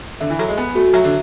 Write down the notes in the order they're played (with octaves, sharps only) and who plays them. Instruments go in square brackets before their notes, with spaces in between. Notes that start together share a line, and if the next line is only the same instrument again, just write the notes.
[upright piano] D3 [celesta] E5
[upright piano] E3
[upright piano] F#3 [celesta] A4
[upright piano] G#3
[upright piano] B3 [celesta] G#5
[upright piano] A3 [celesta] F#4
[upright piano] F#3 [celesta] E5
[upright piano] D3